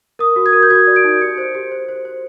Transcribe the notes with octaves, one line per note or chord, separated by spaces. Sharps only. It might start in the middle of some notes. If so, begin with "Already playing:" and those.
A#4 D#6
F#4
G#6
A#4
G6
F#4 G#6
D5
D7
D#4
G4 C#7
C5
G4
C5
C5
C5